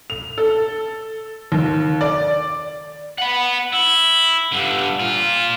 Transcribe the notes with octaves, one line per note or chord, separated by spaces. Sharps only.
F7
A4
D#2
D5
F#5 B5
E4
G2 D3
F4 A#4